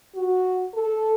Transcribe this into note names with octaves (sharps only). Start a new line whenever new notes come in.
F#4
A4